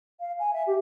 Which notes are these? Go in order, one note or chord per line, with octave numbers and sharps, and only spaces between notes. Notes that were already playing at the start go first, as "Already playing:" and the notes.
F5
G#5
E5
G4